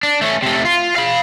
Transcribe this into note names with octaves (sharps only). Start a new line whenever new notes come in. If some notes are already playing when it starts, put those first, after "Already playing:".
D4
A3 C#4
C3 A3
F4
F5 B5